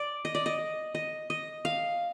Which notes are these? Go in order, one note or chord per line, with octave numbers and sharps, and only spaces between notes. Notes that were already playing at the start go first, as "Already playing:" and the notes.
Already playing: D5
D#5
D5
D#5
D#5
D#5
F5